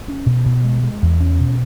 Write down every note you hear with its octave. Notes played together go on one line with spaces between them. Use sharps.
C#4
B2
B2
G#3
G#3
E2
C#4
B2